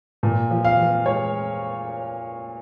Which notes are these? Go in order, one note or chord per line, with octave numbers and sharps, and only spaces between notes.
A#2
F3
F5
F3
G#3 C#5